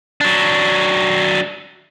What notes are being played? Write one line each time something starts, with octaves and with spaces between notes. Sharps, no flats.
F#3 D4